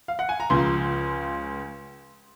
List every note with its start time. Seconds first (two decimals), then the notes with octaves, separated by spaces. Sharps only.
0.08 F5
0.19 F#5
0.29 G#5
0.40 A#5
0.50 C#2 C#3 F3 C6